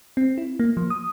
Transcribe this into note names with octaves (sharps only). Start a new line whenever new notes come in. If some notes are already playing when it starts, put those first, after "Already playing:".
C4
E4
A#3
F3
D#6